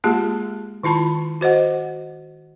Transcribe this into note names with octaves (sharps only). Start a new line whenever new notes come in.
G#3 A#3 F4 G4 G#4 A5
D#3 E4 F4 A5 B5
F#4 C5 D#5 F#5